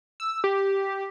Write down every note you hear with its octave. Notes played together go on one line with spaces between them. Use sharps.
E6
G4